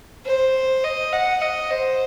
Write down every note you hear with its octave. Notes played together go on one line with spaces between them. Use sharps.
C5
D#5
F#5
D#5
C5